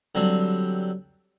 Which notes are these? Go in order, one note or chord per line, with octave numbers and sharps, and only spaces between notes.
D3 F#3 G3 C4 D4